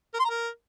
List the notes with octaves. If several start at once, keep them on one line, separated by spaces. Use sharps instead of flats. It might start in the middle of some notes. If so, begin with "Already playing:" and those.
A#4
C6
A#5
A#4